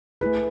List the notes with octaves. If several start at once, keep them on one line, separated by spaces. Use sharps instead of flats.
A3 E4 G#4 B4